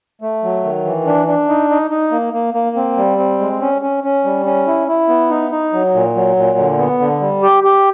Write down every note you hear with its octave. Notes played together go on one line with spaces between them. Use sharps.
A3
F#3
D#3
E3
D4
D4
D#4
D#4
D#4
A#3
A#3
A#3
C4
G3
C4
G#3
C#4
C#4
C#4
G3
C#4
E4
E4
B3
D#4
D#4
F#3
A#2
F#3
A#2
D3
B3
D3
G3
G4
G4